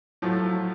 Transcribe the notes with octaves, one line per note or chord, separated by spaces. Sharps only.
A2 F3 F#3 A3